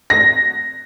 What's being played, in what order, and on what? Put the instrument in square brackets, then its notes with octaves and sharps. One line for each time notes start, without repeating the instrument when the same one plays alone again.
[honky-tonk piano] A#6